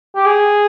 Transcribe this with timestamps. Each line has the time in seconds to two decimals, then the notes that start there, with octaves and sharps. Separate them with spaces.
0.16 G4
0.26 G#4